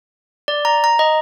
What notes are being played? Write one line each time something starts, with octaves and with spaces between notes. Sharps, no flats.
D5
A#5
A#5
D#5